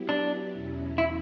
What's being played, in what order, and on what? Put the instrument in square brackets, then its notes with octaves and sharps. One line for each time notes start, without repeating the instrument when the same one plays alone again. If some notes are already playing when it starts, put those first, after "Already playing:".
Already playing: [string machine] F#3 B3 E4 G4
[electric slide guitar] D4
[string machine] E2 B2 F#3 C#4 E4
[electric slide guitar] E4